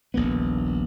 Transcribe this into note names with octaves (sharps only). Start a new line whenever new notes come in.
D#1 A#1 A#3 B3